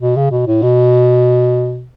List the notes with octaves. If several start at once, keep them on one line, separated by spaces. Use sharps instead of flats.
B2
C#3
B2
A2
B2